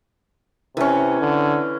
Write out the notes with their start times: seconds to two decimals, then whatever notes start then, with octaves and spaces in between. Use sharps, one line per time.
0.77 C3 E3 C#4
1.21 D3